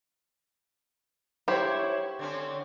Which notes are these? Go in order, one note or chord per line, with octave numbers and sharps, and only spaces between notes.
E4 G4 C5 C#5
D3 C4 C#4